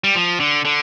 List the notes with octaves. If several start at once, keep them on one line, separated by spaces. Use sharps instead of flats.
G3
F3
D3
D3